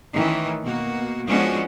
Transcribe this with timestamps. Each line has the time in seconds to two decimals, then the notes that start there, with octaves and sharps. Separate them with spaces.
0.14 D#3 E3 A3 C#4
0.63 B2 A#3 F#4
1.26 F3 G#3 B3 C#4 D4 F#4